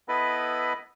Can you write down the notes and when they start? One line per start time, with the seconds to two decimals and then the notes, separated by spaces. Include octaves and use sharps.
0.08 B3 E4 A4 B4 D#5 B5